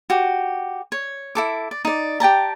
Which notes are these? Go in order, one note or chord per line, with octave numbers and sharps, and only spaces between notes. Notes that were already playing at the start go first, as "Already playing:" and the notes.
F#4 G4
C#5
E4 A4 D6
D5
D#4 D5
G4 G5 A5 A#5